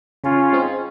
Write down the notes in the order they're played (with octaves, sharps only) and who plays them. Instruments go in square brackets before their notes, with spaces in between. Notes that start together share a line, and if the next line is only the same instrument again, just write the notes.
[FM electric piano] C#3 [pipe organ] C#4 F4
[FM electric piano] G#3 C4 D#4